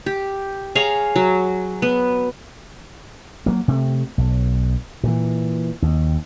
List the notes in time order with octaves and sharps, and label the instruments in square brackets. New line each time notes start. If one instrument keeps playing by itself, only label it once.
[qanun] G4
G#4 C#5 F5 A#5
F#3
B3
[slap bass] F#3 A#3
C3 A3
B1
A#2 E3
D#2